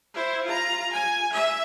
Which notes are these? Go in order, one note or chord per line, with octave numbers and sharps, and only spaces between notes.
E4 C5
F4 A#5
G#5
E5